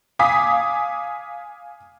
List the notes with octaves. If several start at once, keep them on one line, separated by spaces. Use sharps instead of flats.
F5 G#5 D6 D#6 B6